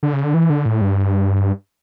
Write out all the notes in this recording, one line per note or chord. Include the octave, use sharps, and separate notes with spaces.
D3
C#3
D3
E3
D3
A2
G2